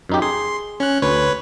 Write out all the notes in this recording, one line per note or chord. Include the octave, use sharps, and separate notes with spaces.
F#2 D#4 G4
G#4 C6
C#4 F#6
D2 B4 C#5